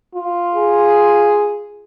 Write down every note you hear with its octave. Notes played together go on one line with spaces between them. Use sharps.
F4
G#4